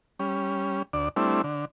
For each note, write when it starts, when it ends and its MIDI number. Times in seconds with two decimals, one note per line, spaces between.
0.20 0.82 55
0.20 0.82 61
0.93 1.09 38
0.93 1.09 74
1.16 1.42 55
1.16 1.42 57
1.16 1.42 60
1.16 1.42 62
1.16 1.42 64
1.44 1.65 50